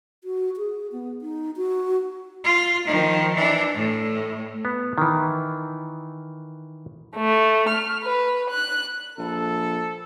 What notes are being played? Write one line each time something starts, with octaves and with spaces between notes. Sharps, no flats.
F#4
G#4
B3
D#4
F#4
F4
D#3 F3
E3 D4
A2
B3
D#3 E3
A3
F6
B4
F#6
A#1 A4